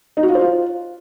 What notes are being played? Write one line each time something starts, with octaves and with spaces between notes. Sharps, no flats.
D#4
F#4
F4
C5
F4